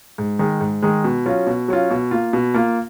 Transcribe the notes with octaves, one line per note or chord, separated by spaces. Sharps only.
G#2
D#3 G#3
G#2
D#3 G#3
B2
F#3 C#4 F4
B2
F#3 C#4 F4
B2
A#3 F4
B2
A#3 F4